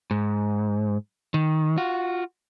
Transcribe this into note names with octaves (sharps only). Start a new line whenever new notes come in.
G#2
D#3
F4 F#4